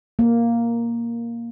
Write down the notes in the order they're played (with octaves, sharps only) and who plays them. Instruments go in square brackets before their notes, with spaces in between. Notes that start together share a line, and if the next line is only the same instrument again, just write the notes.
[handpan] A#3